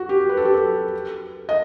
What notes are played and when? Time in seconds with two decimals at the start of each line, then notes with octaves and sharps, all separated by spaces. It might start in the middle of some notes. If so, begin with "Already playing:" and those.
Already playing: F#4
0.09 G4
0.29 B4
0.37 A4
0.45 G4
0.54 A4
1.49 D#5